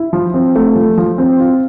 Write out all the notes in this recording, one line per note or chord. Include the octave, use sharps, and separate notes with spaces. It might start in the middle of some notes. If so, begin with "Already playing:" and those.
Already playing: E4
F3
C4
A3
F3
F3
C4
F4